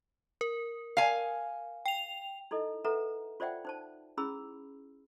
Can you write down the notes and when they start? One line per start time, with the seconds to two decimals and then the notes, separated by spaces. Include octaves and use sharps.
0.41 A#4
0.97 F5 G#5
1.86 G5 F7
2.51 D#4 E4 A4 D#5
2.85 A4 B4 E5 F#5 A#5
3.40 F4 C5 D5 E5 F#5 G5
3.65 D#4 C5 A5
4.17 C#4 E4 G#4 B5 E6